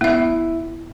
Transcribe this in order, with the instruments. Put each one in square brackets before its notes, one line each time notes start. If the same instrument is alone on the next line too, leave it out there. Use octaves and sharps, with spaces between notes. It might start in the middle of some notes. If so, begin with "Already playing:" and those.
[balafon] B3 E5 [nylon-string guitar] E4